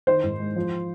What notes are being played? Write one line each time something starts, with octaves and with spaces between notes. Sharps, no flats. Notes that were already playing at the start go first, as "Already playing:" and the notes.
D#3 C5
G#2
G#3
F3